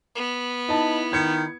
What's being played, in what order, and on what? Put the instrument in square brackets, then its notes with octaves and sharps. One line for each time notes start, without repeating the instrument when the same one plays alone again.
[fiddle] B3
[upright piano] D#4 A5 [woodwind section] E4
[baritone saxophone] D#3 [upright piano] G#6 C#7